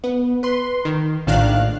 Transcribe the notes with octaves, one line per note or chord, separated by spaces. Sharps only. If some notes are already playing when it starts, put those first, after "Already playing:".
B3
B4 C6
D#3
A#1 A2 D#3 D4 F5 F#6